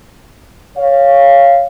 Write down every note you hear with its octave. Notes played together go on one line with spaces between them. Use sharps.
C#5 F5